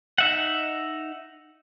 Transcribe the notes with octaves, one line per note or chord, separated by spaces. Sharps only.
D#4 E5 F#5